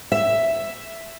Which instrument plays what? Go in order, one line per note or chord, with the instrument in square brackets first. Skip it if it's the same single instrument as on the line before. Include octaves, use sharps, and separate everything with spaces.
[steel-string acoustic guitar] E5